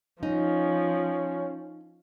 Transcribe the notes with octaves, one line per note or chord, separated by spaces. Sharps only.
F3 C#4 D#4